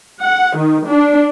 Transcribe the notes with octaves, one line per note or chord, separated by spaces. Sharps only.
F#5
D#3
D4